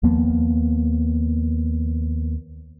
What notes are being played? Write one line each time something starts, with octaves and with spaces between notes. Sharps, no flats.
D#2 F3 A#3 B3